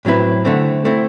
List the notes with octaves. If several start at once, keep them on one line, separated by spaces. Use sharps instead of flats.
A2 F#3 C4 E4 B4
D3 A3 C4
A3 C4 E4